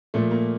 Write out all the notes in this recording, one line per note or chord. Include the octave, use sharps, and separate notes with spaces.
A#2 F3 A3
A#3